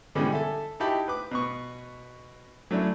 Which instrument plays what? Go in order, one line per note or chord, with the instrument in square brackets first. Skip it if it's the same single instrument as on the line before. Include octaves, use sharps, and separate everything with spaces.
[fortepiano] B2 D3 E3 G3 G#3 C#4
A4 E5 G#5
D#4 E4 F#4 G4 A5 B5
B4 D6
B2 B4 C#6
F#3 A3 C#4 D4 E4